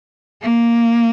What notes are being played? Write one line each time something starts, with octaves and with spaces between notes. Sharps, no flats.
A#3